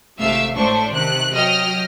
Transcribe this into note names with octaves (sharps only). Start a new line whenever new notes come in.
G#1 C3 A3 E5 F5 E6
A2 A3 D4 C5 C#6
C3 D#3 F#6
F#3 D#5 G5 F6